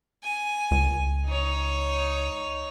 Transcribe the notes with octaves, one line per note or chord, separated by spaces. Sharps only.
G#5
C#2
D#4 C#5